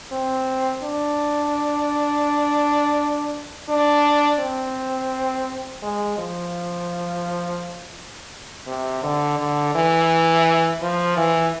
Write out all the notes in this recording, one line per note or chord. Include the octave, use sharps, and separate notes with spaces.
C4
D4
D4
C4
G#3
F3
C3
D3
D3
E3
F3
E3